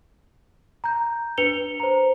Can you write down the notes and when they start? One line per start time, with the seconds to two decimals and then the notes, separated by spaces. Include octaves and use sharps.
0.84 A#5 G6
1.38 D4 B4 C#7 F7 G7
1.80 C5 A#5